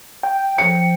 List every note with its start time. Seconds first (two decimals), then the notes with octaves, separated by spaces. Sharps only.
0.23 G5
0.58 F3 C#7